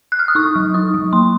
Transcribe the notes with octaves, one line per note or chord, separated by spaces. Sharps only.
F#6
F6
D#6
D#4 C#6
F#3
D#4 D#6
F#3
A#3 C6